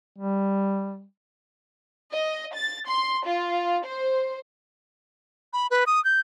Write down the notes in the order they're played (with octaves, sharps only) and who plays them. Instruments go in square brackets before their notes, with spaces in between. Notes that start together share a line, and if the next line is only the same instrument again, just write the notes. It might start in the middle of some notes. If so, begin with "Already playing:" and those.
[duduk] G3
[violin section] D#5
A6
C6
F4
C5
[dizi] B5
B4
D#6
G6